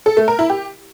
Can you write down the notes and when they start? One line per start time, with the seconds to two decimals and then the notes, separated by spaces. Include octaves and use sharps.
0.06 A4
0.17 A3
0.28 A#4
0.39 E4
0.50 G4